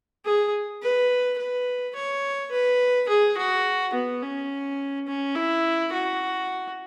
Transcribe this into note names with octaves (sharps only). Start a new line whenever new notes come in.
G#4
B4
B4
C#5
B4
G#4
F#4
B3
C#4
C#4
E4
F#4